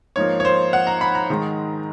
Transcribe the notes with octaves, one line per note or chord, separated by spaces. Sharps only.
G#2 F3 A#3 C#5
C#5
C5
F#5
A#5
B5
A#5
G#2 D#3 G#3